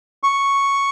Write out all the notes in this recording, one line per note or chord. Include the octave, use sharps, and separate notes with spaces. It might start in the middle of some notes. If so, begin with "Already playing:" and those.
C#6